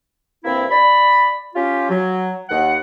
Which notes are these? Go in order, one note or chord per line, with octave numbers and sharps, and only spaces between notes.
G2 C3 A#3 C4 E4
D5 B5
C#4 F4 G4
F#3
D#2 F#5